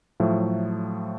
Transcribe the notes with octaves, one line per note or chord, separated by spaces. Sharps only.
A2 F3 F#3 A3